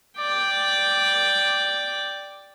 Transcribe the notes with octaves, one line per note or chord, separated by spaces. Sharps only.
D5 G5